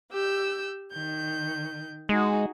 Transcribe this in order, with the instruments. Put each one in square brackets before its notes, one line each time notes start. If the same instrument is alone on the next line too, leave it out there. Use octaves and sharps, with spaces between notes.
[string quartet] G4 E6 G6
D#3 G6
[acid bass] G#3 [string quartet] D#4 F#4 G#4